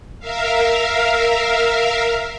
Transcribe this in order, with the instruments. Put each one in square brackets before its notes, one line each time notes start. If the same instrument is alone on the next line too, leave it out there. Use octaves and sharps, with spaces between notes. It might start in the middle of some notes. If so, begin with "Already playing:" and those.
[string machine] A#4 E5 F5